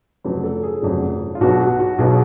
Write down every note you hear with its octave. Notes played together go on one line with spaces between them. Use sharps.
F1 F2 C#3 F#3 B4
A4
G#4
F1 F2 C#3 F#3
F4
B1 B2 F#3 F#4
F#4
F#4
B1 B2 F#3 G#4